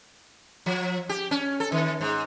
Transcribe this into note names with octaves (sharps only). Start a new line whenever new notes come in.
F3
G4
C#4
A4
D#3
G#2